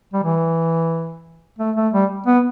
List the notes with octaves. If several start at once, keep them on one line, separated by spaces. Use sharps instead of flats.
G3
E3
A3
A3
G3
B3